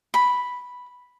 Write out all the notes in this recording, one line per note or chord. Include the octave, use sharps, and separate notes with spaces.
B5